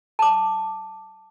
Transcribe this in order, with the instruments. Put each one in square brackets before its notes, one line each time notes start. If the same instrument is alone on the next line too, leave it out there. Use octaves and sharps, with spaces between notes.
[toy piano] A5 D6